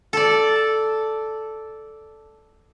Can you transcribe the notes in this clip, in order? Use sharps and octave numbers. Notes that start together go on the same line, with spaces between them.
A4 D5